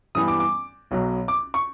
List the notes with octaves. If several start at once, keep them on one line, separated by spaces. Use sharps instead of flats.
G2 E3 G3 B3 D#6
D6
D6
B1 B2 F#3
D6
C#6